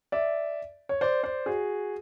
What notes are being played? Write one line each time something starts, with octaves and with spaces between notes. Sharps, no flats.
D5 E5
C#5
C5 D5
C5 D5
F#4 G#4